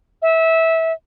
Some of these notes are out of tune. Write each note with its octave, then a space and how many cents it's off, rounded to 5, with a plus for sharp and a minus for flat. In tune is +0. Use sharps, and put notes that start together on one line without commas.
E5 -20